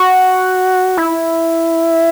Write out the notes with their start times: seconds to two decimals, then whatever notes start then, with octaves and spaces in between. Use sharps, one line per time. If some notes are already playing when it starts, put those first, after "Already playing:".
Already playing: F#4
0.97 E4